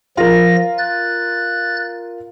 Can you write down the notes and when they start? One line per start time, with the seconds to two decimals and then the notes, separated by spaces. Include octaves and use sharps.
0.17 F3 F4 A#4 A#6
0.78 F#6 A6